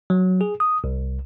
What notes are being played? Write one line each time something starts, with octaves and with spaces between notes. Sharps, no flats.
F#3
G#4
D#6
C2